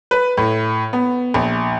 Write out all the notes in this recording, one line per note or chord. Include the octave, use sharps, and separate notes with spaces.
B4
A2
B3
A#1